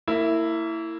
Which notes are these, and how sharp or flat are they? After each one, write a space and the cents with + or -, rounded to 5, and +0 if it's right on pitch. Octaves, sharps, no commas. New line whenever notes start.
A#3 -30 E4 +0